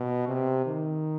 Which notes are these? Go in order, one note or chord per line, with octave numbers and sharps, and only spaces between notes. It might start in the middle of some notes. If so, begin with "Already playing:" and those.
Already playing: B2
C3
D#3